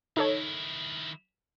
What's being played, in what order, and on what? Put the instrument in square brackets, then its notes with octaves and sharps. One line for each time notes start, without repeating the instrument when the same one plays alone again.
[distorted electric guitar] D#3 E4 [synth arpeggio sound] D#4 A4 C#5